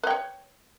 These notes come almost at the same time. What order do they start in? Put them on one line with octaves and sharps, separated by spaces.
B4 G5 C#5